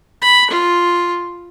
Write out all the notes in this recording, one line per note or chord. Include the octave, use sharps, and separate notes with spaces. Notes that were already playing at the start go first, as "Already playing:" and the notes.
B5
F4